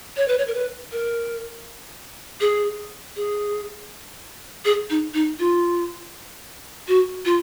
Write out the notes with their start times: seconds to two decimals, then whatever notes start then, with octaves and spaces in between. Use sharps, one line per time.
0.17 C#5
0.28 B4
0.38 C#5
0.47 A#4
0.54 B4
0.92 A#4
2.41 G#4
3.16 G#4
4.65 G#4
4.90 D#4
5.14 D#4
5.39 F4
6.88 F#4
7.25 F4